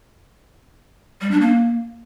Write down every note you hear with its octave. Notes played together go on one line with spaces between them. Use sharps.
G3
D4
A#3